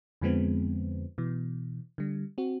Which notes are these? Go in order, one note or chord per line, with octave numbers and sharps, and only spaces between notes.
F2 D3 F3 G#3 B3 C4
B2 E3
D3 G3
C4 F#4